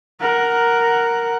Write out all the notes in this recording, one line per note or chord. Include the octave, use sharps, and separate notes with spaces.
A#4 F#5